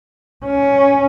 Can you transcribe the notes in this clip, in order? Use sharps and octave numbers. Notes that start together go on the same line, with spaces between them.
C#4